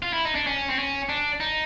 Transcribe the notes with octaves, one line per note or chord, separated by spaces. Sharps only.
F4
E4
D#4
D4
C#4
C4
C#4
D4
D#4